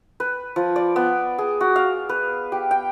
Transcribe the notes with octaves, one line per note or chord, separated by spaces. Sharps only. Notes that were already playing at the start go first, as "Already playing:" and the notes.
B4
F3
D5
B3
G#4
F#4
F5
B4
G4
G5